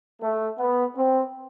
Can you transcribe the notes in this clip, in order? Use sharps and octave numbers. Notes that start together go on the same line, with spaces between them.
A3
B3
C4